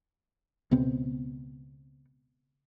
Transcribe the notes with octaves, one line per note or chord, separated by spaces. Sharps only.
C#2 B2 B3 C4